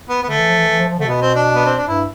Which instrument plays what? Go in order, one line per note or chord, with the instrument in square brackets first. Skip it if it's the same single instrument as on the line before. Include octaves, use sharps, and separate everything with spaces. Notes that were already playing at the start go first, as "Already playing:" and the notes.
[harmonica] B3
B3
[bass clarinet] D3 [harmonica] A3
[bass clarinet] E3
F3
E3
E3
F3
F3
[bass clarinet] D3 [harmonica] A3
[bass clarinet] C3
[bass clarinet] B2 [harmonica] B3
[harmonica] C4
D4
B3
C4
D4
[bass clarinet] G2 [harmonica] E4